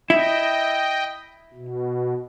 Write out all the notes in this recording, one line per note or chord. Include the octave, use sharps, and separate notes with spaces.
E4 D#5 G5
B2